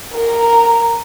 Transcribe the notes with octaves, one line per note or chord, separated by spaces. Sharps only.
A#4 A#5